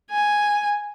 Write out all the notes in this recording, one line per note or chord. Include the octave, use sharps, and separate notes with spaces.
G#5